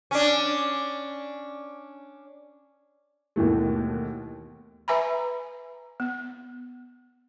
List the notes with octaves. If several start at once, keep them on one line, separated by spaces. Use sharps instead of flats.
C#4 D4
D#2 B2 E3 A3
B4 E5 G#5 A#5 B5
B3